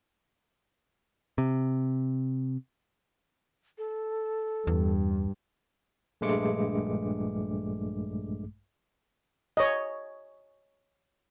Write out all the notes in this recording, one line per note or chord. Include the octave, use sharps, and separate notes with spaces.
C3
A4
E2 G2
A#1 G2 G#3 A3 D6 C#7
C#5 D#5